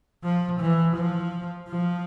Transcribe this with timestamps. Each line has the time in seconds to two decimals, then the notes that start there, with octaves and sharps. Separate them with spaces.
0.24 F3
0.60 E3
0.96 F3
1.68 F3